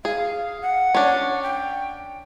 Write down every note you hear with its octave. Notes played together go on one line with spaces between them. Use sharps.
G#4 F5
F#5
C#4 D4
G5